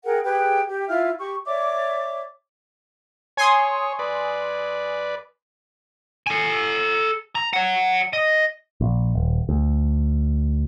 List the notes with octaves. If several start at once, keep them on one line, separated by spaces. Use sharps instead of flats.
G#4 A#4 F#5 G5
G4 G#4 B4 G5
G4
E4 F4 E5 F6
G4 C#6
C#5 D5 E5 D6
C#5 G#5 C6 D#6
B4 D5
A4 G#5
A#5
C#5 F#5
D#5
A#1
D#1
D2